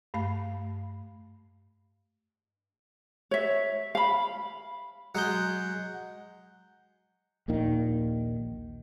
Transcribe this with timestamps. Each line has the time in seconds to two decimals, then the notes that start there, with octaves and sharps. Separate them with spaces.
0.14 G2 A3 F5 B5
3.31 C#5 E5
3.95 F5 B5
5.15 F#3 G#3 F#5 G6
7.48 A#1 D#2 A#2 D#3